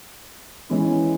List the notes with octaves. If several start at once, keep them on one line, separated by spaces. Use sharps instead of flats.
E3 G#3 C#4 E4